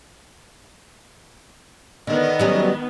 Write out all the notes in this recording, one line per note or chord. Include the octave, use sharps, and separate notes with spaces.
D3 D#3 B3 D#5
F#3 G3 C#4